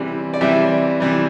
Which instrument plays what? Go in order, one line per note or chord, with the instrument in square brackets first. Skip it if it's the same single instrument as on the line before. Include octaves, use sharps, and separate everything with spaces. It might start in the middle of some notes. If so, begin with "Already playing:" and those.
Already playing: [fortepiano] C3 E3 G3
D5
C3 E3 G3 E5
C3 E3 G3